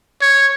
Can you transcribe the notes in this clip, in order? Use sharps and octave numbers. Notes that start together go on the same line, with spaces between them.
C#5